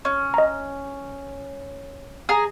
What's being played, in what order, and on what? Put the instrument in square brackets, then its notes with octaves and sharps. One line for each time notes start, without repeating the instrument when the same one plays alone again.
[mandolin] C#4
[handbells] D#5 A#5
[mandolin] G#4 A#5